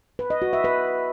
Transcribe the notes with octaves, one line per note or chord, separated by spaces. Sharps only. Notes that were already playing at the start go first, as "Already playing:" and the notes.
B4
D#5
F#4
E5
B4